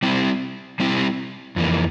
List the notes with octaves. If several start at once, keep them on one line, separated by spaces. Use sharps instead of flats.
G3 C4 E4
G3 C4 E4
F2 E3 A#3